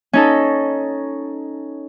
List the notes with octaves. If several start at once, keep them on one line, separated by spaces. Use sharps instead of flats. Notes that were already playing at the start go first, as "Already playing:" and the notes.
C#4 D#4 A4